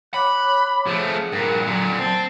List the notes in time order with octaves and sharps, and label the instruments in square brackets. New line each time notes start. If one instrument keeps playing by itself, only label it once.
[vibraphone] C#5 D6 [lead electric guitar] B5 [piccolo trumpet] F#6
[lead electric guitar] F3 A3 [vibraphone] G#4 A5 [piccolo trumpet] F#5
[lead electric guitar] G2 A#2 [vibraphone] A#4
[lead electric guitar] A#2 D3 [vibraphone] F#3
[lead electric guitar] C4 [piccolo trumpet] A5